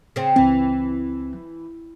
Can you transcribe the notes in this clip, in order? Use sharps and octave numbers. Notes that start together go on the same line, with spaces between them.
C#3 C4
C#2 E3 C4